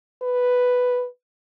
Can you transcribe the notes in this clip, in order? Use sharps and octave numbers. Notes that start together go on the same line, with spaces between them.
B4